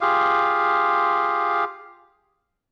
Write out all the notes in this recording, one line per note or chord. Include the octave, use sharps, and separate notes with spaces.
F4 G4 G#4 F5